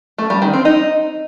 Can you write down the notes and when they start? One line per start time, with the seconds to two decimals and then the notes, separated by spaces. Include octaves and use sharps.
0.18 A3
0.30 G3
0.42 D#3
0.53 C4
0.65 D#4